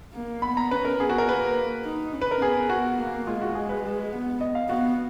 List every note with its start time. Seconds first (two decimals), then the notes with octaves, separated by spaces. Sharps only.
0.15 A#3
0.42 B3 B5
0.57 A#5
0.71 C#4 B4
0.85 A#4
1.00 B3 G#4
1.09 F#4
1.18 A#4
1.27 A#3 B4
1.85 D#4
2.13 C#4
2.22 B4
2.31 A#4
2.41 B3 G#4
2.69 B3 F#4
2.99 A#3
3.27 G#3 F4
3.41 F#4
3.55 G#4
3.69 B4
3.83 G#3
4.12 B3
4.41 D#5
4.55 F5
4.69 B3 F#4